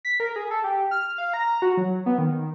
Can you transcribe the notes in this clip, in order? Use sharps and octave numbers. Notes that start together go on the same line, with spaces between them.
B6
A#4
G#4
A4
G4
F6
F5
A#5
F#4
F#3
B3
D#3